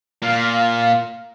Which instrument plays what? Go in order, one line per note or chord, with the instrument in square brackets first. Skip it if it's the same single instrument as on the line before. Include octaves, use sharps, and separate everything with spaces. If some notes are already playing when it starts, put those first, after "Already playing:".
[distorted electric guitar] A#2 [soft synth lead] F5